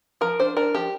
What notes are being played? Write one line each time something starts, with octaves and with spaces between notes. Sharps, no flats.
F3 A#4
D4 C5
D4 A#4
F3 G4